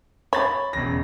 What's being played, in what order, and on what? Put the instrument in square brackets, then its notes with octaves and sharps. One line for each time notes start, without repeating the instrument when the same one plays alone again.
[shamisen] C#5 [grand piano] B5 A6
[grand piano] E1 C#3 A#6